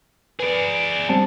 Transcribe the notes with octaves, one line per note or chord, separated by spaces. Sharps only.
G#4 B4 D5
G3 C4 A5